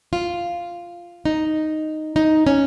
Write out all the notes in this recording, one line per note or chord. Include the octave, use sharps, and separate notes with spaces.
F4
D#4
D#4
C#4